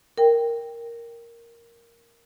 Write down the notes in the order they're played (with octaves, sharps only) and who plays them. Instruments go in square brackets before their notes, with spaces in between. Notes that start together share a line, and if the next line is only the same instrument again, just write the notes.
[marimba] A#4 G5